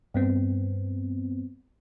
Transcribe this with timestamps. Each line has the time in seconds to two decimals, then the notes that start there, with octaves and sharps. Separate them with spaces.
0.14 G2 B3 C4